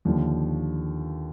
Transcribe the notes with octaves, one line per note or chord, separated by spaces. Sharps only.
D#2 D3 F3